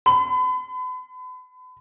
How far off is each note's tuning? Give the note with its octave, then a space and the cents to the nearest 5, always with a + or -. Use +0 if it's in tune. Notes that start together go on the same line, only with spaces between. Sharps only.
B5 +40